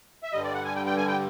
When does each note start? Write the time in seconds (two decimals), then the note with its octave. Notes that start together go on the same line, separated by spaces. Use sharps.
0.23 E5
0.32 G2 D3 G3 D#5
0.44 D5
0.54 F#5
0.65 G#5
0.75 G5
0.86 G5
0.97 G#5
1.08 G5